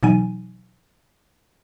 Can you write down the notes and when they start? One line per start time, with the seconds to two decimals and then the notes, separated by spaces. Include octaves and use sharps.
0.03 B2 E3 F#3 D#4 G#5 D#7